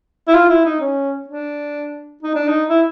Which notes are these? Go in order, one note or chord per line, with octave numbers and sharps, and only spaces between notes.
E4
F4
E4
D#4
C#4
D4
D#4
D4
D#4
E4